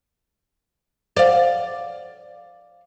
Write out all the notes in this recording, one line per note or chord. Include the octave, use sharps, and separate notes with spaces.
D5 F5